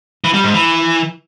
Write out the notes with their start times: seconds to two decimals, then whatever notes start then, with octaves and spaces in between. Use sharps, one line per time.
0.24 E3
0.34 G3
0.44 G#2
0.54 E3